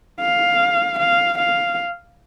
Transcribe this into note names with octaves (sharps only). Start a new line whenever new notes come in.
F5
F5
F5